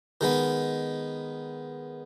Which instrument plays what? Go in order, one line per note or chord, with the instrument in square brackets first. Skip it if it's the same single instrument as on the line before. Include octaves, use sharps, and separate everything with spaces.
[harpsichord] D#3 G#3 B3